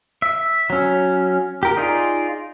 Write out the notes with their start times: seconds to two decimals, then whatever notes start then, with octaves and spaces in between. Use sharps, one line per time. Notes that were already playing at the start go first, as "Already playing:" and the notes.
0.22 E5
0.70 F#3 C#4
1.63 G4 A#4
1.77 D#4 F4 G#4 D5 D#5